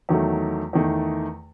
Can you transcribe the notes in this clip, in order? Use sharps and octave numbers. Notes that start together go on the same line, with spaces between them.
E2 D#3 F#3 A3
E2 D#3 A3